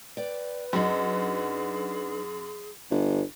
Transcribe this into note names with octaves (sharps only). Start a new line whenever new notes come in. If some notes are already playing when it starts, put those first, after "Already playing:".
B4 D5 G5
F#2 F#3 D4 D#4 G#4
G1